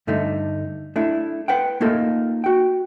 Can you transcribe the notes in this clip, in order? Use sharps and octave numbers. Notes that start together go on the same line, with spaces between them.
G2 D3 A3 D#4
A3 D4 E4
B4 F#5 G5
A3 A#3 D#4 F4 A4
F#4 G5